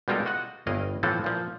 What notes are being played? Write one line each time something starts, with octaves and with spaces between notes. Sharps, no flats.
B2 G3 G#3 F4 A4 A#4
F#4 D#5 F#5
G1 G2 E4 D#5 F5
A2 E3 F3 B3 C4 A4
A#2 F3